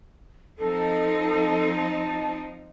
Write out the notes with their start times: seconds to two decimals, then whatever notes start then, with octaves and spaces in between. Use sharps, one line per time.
0.59 F3 C4 D#4 A4
1.75 A5